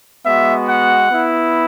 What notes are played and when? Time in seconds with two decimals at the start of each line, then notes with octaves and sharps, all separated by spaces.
0.25 G#3 B3 F#4 E5
0.68 F#5
1.10 B3 E4